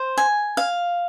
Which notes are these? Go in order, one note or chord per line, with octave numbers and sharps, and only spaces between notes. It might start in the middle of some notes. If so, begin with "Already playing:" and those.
Already playing: C5
G#5
F5